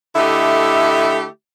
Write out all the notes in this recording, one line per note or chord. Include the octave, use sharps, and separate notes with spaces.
D3 A3 E4 G4 D#5 E5